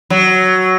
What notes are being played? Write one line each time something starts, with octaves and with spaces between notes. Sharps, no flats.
F#3